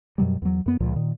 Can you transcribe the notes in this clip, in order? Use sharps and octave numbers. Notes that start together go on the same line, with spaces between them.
F#2 B2 F#3 G3
E2 F#3
F#2 B3
C#2 A#2 F3
A#2 D#3